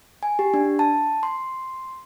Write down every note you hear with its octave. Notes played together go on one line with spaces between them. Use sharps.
G#5
G4
D4
A5
C6